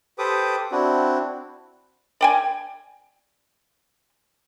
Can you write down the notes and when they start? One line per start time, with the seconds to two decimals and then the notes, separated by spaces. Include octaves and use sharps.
0.18 G4 A4 B4 C5 D6 D#6
0.72 C4 D4 E4 F#4
2.21 D5 G5 G#5